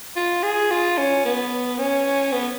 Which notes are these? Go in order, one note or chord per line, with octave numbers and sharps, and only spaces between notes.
F4
G#4
F4
C#4
B3
C#4
B3